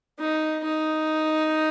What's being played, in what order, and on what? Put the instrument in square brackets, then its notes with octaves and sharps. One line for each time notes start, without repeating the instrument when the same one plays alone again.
[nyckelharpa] D#4
D#4